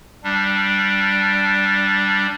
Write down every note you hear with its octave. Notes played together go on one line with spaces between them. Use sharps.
G3 D4